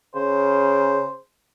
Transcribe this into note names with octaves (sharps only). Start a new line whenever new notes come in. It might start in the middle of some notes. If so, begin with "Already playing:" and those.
C#3 C5